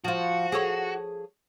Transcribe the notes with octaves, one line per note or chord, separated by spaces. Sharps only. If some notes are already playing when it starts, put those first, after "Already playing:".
F3 F4 F#4
G#4 A4 C#5